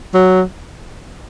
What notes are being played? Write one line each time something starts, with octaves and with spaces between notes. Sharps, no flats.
F#3